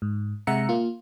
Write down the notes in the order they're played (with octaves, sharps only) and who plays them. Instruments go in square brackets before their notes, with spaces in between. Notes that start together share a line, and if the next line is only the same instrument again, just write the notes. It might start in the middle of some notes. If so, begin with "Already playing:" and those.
[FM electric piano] G#2
C3 G#3 E5 F#5 A#5 C#7
A#3 F4